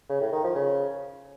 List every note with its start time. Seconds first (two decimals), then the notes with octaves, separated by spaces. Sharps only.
0.09 C#3
0.21 A2
0.32 D#3
0.44 F3
0.55 C#3